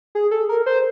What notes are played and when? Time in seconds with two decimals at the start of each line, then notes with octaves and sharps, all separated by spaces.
0.15 G#4
0.31 A4
0.49 A#4
0.66 C5